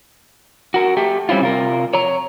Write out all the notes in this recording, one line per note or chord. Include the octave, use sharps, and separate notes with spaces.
F#4 A#4
A3 G4
G3 C4 C#4 E4 F4
C3 F4 A#4
C#5 A#5